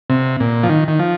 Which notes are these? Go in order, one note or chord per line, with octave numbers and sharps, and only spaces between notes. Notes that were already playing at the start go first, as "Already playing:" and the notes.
C3
A#2
F3
D#3
D#3
F3